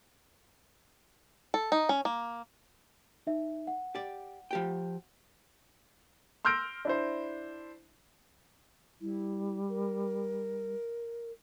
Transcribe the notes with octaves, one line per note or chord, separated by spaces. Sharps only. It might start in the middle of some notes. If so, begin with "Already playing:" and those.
A4
D#4
C#4
A#3
D#4 E5
F#5
G4 D5
F3 G4 G5
C6 E6 F6 G6 A#6 D7
D4 E4 C5
G3 E4
A#4